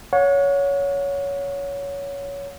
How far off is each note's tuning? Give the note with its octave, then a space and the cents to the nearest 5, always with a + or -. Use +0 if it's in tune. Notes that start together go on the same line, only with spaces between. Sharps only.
C#5 +15 F#5 -35